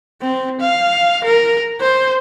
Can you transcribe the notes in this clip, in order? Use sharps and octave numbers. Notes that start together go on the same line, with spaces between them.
C4
F5
A#4
C5